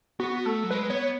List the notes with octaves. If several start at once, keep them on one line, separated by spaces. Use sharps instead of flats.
B3 F#4
A3 A4
F#3
G#3 B4
B3 C#5